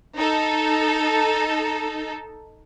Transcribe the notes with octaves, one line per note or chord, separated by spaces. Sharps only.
D#4 A4